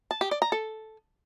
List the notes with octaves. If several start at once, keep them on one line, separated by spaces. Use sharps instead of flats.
A5
G4
D5
A#5
A4